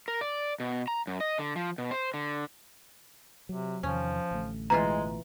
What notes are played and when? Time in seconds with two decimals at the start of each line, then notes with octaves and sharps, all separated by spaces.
0.08 A#4
0.21 D5
0.60 B2
0.88 A#5
1.07 F#2
1.20 D#5
1.38 D3
1.56 F3
1.78 B2
1.91 C5
2.14 D3
3.49 C3 F#3
3.83 E2 C3 D#3 F3 C#4
4.31 A1 D3 A3
4.70 B2 E3 G#3 F4 A#5